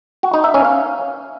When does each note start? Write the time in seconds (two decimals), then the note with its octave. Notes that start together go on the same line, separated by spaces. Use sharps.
0.23 F#4
0.34 D#4
0.44 E5
0.54 C#4
0.65 F5